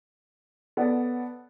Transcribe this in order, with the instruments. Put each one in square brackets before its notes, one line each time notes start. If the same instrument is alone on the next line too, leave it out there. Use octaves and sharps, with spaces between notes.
[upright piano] B3 A4 C#5 D5 F#5